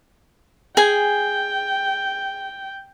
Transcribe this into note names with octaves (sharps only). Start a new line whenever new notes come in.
G#4 G5 G#5